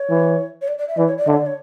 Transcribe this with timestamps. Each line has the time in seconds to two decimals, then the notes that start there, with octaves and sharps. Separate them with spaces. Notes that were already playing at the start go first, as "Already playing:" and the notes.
Already playing: C#5
0.09 E3
0.62 C#5
0.68 D5
0.78 D5
0.88 E5
0.97 E3 D5
1.08 C#5
1.18 D5
1.27 D3 E5
1.33 C#5
1.37 D5
1.46 C#5